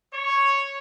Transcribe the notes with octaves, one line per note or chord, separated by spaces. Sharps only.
C#5